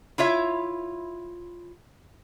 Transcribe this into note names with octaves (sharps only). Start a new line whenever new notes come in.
E4 F4 C#5 E5